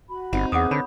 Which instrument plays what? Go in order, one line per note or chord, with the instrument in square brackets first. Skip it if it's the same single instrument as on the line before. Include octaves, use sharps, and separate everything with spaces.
[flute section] F#4 B5
[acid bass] G1 [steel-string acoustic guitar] C4 D#4 [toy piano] F#5
[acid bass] E2 [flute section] G#4 B4 [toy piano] F#5 D6 D#6
[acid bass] D3 [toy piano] C#5 B5